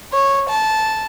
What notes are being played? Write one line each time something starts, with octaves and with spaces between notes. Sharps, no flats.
C#5
A5